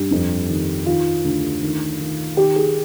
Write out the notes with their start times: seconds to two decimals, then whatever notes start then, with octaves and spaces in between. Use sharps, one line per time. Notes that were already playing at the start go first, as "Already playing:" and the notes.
Already playing: G2 G4
0.11 F2
0.49 D#3
0.86 D#3 F4
1.24 D2
1.62 D#3
1.99 D#3
2.37 D#3 G4
2.56 G#4